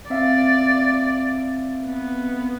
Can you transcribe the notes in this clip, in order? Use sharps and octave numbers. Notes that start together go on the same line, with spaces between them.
C4 D5 E5 F5
B3